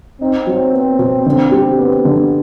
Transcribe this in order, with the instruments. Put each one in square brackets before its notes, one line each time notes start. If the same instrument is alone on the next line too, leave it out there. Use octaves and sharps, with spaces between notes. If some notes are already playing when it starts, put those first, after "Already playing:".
[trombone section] C4 [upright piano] D#4
[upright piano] F#3
B3
B2
D3
G3
B3
D3